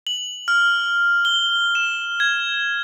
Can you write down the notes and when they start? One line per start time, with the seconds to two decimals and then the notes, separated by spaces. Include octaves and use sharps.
0.07 F#7
0.48 F6
1.25 G7
1.75 E7
2.20 G#6